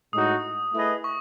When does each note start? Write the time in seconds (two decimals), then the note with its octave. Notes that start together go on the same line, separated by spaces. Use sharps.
0.13 A2 G#3 D#4 F#4 D#6
0.74 A3 E4 G#4 B4 D#5
1.04 C#6